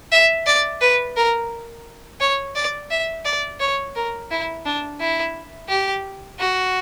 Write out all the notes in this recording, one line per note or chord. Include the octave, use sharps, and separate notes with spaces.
E5
D5
B4
A#4
C#5
D5
E5
D5
C#5
A#4
E4
D4
E4
G4
F#4